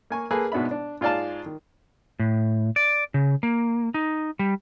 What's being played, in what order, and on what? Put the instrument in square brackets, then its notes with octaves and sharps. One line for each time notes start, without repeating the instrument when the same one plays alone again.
[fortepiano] A#3 G#5 C#6
A#3 G#4 A4 B4
G#2 B2 B3 D4 E5 B5
D4
G#2 F4 G#4 D5 F5 A5
D#3
[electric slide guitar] A2
D5
C#3
A#3
D#4
G3